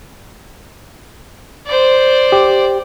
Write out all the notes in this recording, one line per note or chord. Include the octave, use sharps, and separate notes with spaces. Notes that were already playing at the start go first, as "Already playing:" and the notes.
C5 D5
G4